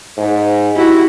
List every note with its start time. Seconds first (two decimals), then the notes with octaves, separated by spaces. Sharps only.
0.17 G#2
0.75 E4 F#4 G4